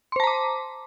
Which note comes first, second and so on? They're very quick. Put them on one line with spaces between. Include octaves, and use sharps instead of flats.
C6 C5 A5 A#5 D6